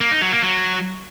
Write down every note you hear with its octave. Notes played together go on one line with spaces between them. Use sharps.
A#3
D#4
F#3
A#3
F#3